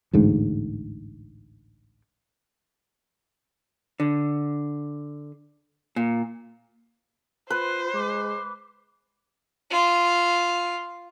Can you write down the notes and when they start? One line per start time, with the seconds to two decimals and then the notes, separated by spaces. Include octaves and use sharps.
0.13 A1 D2 G#2
4.00 D3
5.96 A#2
7.50 F4 B4 C5
7.94 G#3 D6
9.71 F4